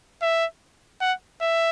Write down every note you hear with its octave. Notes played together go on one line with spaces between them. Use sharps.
E5
F#5
E5